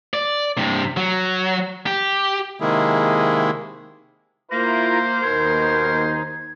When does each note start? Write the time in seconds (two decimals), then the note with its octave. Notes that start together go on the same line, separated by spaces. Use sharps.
0.14 D5
0.57 G2 C3
0.97 F#3
1.86 G4
2.60 C3 D#3 G#3 A#3 E4 G#4
4.51 A#3 E4 F4 A#4 C5 A#6
5.22 D#2 B2 D#4 A#4 G#6